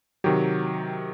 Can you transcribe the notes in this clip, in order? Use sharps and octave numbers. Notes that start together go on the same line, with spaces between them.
C3 D#3 F#3 G4